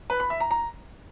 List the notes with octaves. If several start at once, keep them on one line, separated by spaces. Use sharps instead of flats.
B4
B5
E5
A#5
A#5